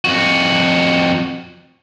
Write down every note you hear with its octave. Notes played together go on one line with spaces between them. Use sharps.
F2 F#4